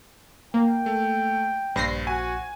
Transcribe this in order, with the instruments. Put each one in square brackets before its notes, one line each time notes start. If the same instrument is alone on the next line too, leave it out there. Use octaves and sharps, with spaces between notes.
[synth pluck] A#3 [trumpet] G5
[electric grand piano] A3
[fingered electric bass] A#1 [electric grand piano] G2 [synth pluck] C5 A#6 C7
[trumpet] F#4 [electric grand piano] G#5